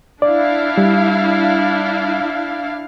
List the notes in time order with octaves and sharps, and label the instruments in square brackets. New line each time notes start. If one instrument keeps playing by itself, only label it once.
[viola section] D4 E4 F5 [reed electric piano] D5
[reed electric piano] G3